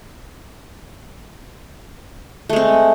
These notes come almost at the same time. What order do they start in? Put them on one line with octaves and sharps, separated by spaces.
A3 G#3 C4